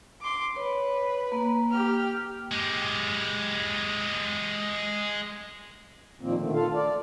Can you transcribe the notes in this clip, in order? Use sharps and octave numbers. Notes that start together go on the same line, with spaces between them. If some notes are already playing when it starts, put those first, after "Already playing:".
C6 D6
B4 C#5
A#3
G4 F6
G#3 G4
A#2 D#3 F3 A#3 C4
D3 D#3 A3
F4 A4 F5
D5